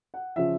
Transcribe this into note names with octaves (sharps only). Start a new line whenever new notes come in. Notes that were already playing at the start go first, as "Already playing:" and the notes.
F#5
C#3 F3 E5